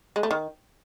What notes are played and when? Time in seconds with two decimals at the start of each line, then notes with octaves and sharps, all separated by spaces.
0.16 G#3
0.23 A3
0.31 D#3